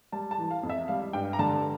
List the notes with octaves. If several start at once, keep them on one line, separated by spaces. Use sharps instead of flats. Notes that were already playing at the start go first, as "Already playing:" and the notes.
G3 A5
A5
E3
F5
F2
E5
G3 F5
G2 G5
A#5
D3 A5